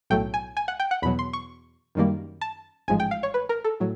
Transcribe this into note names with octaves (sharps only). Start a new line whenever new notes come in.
B1 A2 F#3 A3 G5
G#5
G#5
F#5
G5
F#5
E2 B2 F#3 B5
C6
C#6
F#2 D#3 G3 A#3
A5
A1 G#2 F3 G#3 G#5
G5
F5
C#5
B4
A#4
A4
A2 F#3